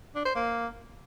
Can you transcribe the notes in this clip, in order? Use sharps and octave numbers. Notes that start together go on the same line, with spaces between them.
D4
C5
A#3